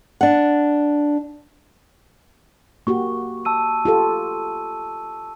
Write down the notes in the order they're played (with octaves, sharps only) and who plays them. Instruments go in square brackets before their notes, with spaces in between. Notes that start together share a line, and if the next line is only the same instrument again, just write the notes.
[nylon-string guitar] D4 F#5
[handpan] A#3 F#4 G4 [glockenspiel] C#6
[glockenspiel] A5 E6 D#7
[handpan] F4 G4 A4